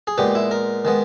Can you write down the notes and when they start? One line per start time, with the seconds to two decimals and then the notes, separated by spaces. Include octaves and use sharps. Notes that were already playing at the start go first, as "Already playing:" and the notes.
0.07 G#4
0.18 A#2 G#3 B3 G4
0.35 E4
0.51 A#4
0.85 D#3 G#3 B3